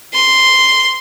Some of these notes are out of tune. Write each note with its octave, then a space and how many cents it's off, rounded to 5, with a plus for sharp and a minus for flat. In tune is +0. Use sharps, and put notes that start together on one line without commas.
C6 -5